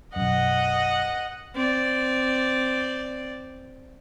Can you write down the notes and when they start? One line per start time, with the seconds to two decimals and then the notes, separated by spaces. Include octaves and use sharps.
0.16 B1 F#2 D#5 F#5
1.55 C4 D5